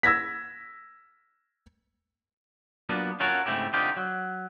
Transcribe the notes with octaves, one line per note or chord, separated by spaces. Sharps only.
E6 G#6 A#6 B6
F#3 A#3 B3 D4 F4
C#4 F4 F#4 A4 A#4 C#5
G#2 C#3 A3 C4 E4 G4
D3 C4 D#4 F4 G4
F#3